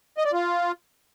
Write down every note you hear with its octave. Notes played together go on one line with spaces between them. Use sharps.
D#5
D5
F4